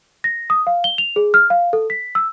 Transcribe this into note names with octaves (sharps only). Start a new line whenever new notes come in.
A#6
D#6
F5
G7
F7
G#4
F6
F5
A4
B6
E6